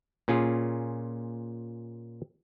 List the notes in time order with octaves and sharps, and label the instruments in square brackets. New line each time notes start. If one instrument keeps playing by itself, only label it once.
[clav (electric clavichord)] A#2 C#4 F4 G#4